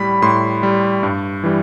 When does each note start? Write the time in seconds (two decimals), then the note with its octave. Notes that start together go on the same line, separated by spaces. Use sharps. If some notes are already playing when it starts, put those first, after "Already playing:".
Already playing: A2 G3 B5
0.22 A2 C6
0.63 G3
1.03 G2
1.44 E3 G3